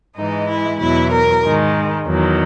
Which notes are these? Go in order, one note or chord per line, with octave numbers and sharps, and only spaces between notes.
G#2 E3 G#3 D#4
E4
E2 B2 F#3 E4
A#4
G#2 D#3 G#3
E2 D#3 F#3